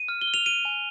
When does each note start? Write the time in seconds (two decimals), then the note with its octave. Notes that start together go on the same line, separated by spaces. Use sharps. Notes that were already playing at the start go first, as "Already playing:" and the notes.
Already playing: D#7
0.09 F6
0.21 G7
0.27 F6
0.34 F7
0.46 F6 D#7
0.65 G#5